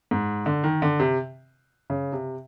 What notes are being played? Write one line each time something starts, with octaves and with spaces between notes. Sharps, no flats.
G#2
D3
D#3
D3
C3
C#3
C3